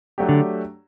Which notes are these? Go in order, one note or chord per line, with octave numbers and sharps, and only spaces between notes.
F#3 A3 D4 G4
D3